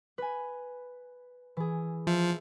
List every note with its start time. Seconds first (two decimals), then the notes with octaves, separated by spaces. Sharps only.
0.18 B4 G#5
1.57 E3 G#4
2.07 F3 E5